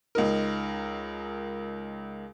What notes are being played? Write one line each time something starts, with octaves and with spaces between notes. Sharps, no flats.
C#2 D#4 A#4